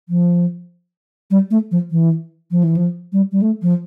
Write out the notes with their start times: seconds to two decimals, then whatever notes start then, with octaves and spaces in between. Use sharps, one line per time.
0.09 F3
1.31 G3
1.51 A3
1.71 F3
1.91 E3
2.51 F3
2.63 E3
2.77 F3
3.13 G3
3.32 G3
3.42 A3
3.62 F3